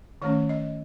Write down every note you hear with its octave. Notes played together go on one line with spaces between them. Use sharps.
D#3 A3 C#4 C#5
D#5